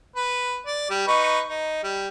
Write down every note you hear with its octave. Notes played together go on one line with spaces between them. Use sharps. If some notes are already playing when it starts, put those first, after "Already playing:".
B4
D5
G3
D#4 B4 C#6
D#4
G3